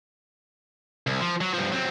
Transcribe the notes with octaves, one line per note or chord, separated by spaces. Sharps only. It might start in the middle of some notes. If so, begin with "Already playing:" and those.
C2
F3
F#3
G2 F3
F#3 C4